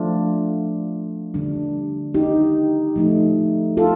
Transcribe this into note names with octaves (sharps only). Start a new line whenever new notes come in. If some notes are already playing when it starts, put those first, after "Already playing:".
Already playing: F3 A3 D4 F4
D3 G3 D4
D#4 G4
F3 A3 D#4
F4 A4